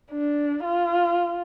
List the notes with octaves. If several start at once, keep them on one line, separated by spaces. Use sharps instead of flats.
D4
F4